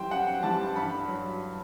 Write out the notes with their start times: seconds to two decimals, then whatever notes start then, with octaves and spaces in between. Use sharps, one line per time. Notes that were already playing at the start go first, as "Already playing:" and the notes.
Already playing: F#2 E3 G3 C5 G5
0.11 F#2 F#5
0.43 E3 G3 A5
0.75 G2 B5
1.08 F#3